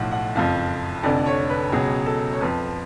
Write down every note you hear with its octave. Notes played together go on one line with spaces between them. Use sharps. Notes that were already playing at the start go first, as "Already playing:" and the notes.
Already playing: B1 A2 F3 F#5
F#5
F#1 F2 F3 F5
F1 F2 D3 D5
C#5
B4
C#2 B2 F#3 G#4
A4
C#5
F2 F3 B4